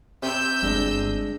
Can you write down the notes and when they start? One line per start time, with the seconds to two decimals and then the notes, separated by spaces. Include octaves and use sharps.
0.23 C3 E6 G6
0.62 G1 G#3 D4 B4